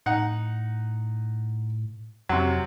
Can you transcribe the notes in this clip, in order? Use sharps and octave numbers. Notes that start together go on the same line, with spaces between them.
A2 D#4 F#5
F2 C3 F#3